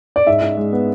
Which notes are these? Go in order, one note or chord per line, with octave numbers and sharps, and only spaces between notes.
D5
G#2 E5
G#2
G#3
B3